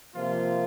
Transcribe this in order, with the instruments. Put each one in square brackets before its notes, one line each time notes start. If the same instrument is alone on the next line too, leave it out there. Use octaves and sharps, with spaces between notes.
[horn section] C3 F3 A#3 F4